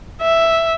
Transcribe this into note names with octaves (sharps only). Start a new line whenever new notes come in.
E5